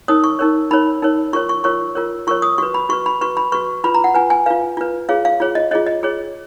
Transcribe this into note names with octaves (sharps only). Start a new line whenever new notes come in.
D#4 A#4 C#5 D#6
C#6
D#4 A#4 C#5
D#4 A#4 C#5 B5
D#4 A#4 C#5
F4 A#4 C#5 C#6
C#6
F4 A#4 C#5 C#6
F4 A#4 C#5
F4 A#4 C#5 C#6
D#6
F#4 B4 C#6
B5
F#4 B4 C#6
B5
F#4 B4 C#6
B5
F#4 B4 C#6
F4 B4 B5
A#5
F#5
F4 B4 G#5
G#5
F4 B4 F5
F4 B4
F4 G#4 C#5 F5
F5
F4 G#4 C#5
D#5
F4 G#4 C#5 D#5
D#5
F4 G#4 C#5